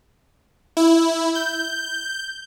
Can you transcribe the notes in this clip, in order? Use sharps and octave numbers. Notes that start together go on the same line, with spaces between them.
E4
G6